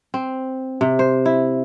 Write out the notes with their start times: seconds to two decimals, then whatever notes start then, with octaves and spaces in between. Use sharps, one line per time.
0.14 C4
0.81 C3
0.99 C5
1.26 E4